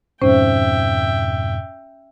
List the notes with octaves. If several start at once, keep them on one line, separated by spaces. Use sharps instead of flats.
F2 G#2 B2 C#4 C5 E5 G5